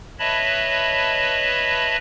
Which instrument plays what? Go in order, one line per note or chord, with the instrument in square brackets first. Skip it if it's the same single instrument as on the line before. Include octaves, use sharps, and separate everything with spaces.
[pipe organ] B4 C#5 D#5 E5 A5 B5